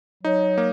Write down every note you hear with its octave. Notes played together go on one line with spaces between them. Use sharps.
F#3 D#4
A#3